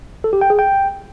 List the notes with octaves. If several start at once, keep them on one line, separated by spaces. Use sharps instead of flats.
A4
G4
G5
G#4
G5